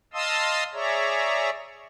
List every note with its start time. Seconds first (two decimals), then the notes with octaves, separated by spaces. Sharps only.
0.14 D#5 F5 A5 C6 D#6 E6
0.73 G#4 C#5 D5 E5 A#5